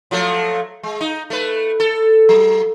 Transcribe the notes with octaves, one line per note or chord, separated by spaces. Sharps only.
F3 F#3 A3
G#3
D#4
A3 B4
A4
F#3